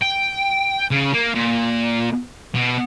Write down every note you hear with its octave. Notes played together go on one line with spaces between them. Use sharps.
G5
C#3
A#3
A#2
B2